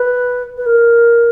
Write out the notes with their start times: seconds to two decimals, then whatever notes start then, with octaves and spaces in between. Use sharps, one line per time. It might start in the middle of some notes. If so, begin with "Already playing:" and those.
Already playing: B4
0.57 B4
0.66 A#4